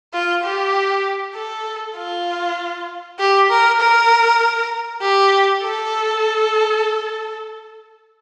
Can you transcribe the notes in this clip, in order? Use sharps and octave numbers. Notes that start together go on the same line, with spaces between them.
F4
G4
A4
F4
G4
A#4
A#4
G4
A4